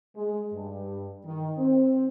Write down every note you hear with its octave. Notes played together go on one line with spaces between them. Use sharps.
G#3
G2
D#3
C4